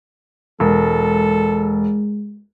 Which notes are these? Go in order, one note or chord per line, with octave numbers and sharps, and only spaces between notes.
E1 G#3 A4